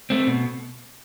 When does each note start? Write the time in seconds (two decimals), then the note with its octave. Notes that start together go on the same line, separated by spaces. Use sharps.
0.10 A3 C4
0.27 B2